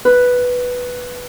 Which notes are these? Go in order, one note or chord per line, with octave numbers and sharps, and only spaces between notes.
B4